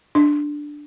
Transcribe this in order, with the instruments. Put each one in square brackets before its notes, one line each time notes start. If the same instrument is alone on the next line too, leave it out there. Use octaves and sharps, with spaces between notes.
[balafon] D4